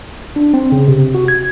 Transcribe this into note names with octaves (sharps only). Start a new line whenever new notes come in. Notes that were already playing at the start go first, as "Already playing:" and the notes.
D4
C4
C#3
C3
F#4
G#6